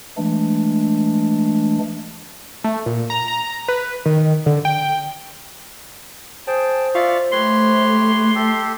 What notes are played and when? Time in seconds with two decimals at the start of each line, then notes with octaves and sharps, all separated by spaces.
0.17 E3 G#3 A3 D4
2.64 A3
2.86 A#2
3.10 A#5
3.28 A#5
3.68 B4
4.06 D#3
4.46 D3
4.65 G5
6.47 G#4 C5 G5 A5
6.95 F4 D5 E5 C#6
7.32 A3 G4 B4 C#5 C6
8.35 G4 A4